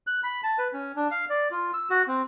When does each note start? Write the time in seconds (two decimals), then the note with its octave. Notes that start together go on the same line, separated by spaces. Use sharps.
0.07 F#6
0.23 B5
0.43 A5
0.59 B4
0.73 C#4
0.96 D4
1.11 F5
1.30 D5
1.51 F4
1.74 E6
1.90 F#4
2.08 C4